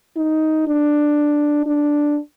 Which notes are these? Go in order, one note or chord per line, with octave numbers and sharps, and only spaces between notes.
D#4
D4
D4